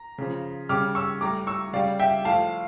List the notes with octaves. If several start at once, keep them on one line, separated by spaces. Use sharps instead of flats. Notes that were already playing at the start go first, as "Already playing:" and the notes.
Already playing: A#5
C#3 F3
C#3 G3 D6 F6
C#6 E6
A2 G3 A#5 D6
C#6 E6
C#3 G3 D5 F5
E5 G5
A2 F3 F5 A5